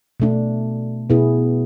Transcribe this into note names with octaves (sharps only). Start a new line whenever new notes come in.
B2 A3 D4
B2 B3 E4 G#4